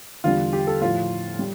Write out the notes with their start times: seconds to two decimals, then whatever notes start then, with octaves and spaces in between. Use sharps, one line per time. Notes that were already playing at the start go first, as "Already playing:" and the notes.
0.24 E2 D3 G3 F4
0.53 G4
0.67 A4
0.81 A2 F3 F4
1.39 G3